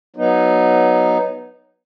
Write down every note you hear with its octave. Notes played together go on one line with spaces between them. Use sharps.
F#3 B3 D#4